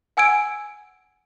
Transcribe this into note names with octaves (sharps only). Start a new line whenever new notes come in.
F#5 G#5 E6 G#6 D7